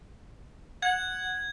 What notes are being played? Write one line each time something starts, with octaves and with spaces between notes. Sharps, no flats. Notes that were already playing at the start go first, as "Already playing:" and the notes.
F#5 G#6